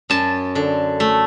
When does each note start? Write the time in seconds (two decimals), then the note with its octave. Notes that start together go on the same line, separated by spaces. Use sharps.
0.10 F#2 A5
0.55 D3
1.00 A3